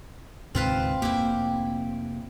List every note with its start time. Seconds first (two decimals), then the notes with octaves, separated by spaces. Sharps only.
0.55 D2 G#2 C3 C4 F4 B4
1.02 F1 F2 A#3 E4 G4